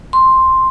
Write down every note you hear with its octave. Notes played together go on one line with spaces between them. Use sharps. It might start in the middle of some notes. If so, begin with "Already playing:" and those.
C6